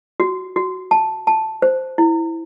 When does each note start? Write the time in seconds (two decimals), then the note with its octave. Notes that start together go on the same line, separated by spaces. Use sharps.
0.20 F#4
0.56 F#4
0.91 A5
1.27 A5
1.62 C5
1.98 E4